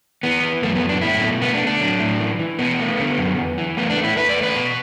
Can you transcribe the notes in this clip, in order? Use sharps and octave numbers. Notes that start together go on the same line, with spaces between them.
E3 B3
E3
F#2 A3
B3
F#2
D4
A3 E4
B2
A3 B3
D4
A3
D4
F#3
A2
E3
E3
B2 B3
A3
D3
F#2
E2
E3
A3 B3
D4
A3
E4
E2 B4
D5
A3
B4
B2